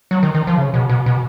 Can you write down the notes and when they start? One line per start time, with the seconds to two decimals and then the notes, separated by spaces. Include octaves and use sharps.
0.11 F#3
0.23 D#3
0.34 D#3
0.47 F3
0.58 C#3
0.74 B2
0.89 B2
1.06 B2